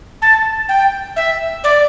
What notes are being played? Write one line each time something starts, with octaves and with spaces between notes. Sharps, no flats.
A5
G5
E5
D5